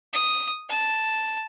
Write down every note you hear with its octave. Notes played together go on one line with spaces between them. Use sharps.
D#6
A5